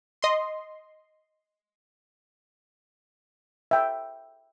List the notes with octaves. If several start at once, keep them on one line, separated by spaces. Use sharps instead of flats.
D#5 C6
E5 G5